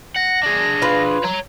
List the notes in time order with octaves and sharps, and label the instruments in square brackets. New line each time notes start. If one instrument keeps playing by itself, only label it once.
[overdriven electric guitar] F#5 [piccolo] A#6
[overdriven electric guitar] D4 G#4
[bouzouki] F4 B4
[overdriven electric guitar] C#5 A#5